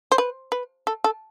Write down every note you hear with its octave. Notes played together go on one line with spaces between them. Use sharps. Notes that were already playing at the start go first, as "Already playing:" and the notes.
C5
B4
B4
A4
A4